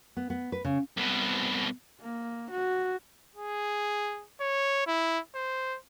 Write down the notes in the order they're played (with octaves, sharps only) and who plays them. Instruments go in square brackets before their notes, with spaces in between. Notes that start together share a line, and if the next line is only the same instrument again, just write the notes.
[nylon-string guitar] B3
B3
B4
C#3
[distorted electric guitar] C2 B2
[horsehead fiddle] A#3
F#4
[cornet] G#4
C#5
E4
C5